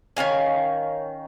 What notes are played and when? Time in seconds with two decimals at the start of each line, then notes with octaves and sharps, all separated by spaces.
0.17 D#3 C#4 F5 G#5